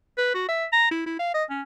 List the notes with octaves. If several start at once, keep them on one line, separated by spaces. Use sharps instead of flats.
B4
F#4
E5
A#5
E4
E4
F5
D#5
C#4